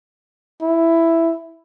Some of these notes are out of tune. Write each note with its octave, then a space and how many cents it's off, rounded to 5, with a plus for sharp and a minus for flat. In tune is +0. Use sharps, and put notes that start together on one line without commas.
E4 +5